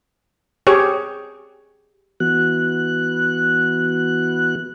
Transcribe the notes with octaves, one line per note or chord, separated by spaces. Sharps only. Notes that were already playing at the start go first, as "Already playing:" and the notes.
G4 G#4 C#5
E3 B3 F#4 F#6